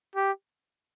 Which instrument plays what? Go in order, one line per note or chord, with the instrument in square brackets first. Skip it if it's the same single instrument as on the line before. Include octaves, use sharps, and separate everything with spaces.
[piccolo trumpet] G4